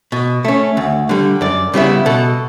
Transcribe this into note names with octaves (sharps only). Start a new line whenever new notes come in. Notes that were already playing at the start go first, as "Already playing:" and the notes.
B2
A3 C#4
D2
D3 G3
F#2 D5
C#3 G3 B3 E4
B2 A4